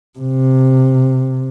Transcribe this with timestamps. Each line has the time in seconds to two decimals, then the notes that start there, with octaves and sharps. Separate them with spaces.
0.19 C3